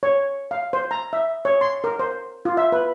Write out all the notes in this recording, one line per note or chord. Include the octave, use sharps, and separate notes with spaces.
C#5
F5
C5
A#5
E5
C#5
C6
A#4
C5
F4
E5
B4